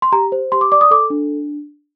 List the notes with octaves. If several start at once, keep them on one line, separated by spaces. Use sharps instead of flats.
C6
G4 A#5
C5
G4 C6
D6
D5 D6
D#6
A4 D6
D4